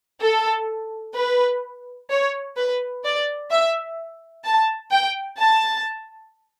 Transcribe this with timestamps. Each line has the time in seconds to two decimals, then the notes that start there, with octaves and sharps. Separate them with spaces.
0.21 A4
1.15 B4
2.10 C#5
2.57 B4
3.04 D5
3.50 E5
4.44 A5
4.92 G5
5.39 A5